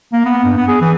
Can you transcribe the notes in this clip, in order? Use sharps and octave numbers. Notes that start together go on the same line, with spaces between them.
A#3
B3
G2
B3
G#4
E3